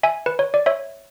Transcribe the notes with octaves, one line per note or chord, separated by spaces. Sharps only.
E5 G#5
B4
C#5
D5
C#5 E5